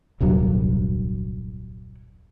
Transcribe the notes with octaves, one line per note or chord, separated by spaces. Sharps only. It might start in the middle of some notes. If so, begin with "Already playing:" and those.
D#1 C2 G2 F#3